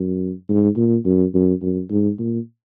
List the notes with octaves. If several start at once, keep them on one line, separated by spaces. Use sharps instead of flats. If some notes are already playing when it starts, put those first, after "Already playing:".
Already playing: F#2
G#2
A#2
F#2
F#2
F#2
G#2
A#2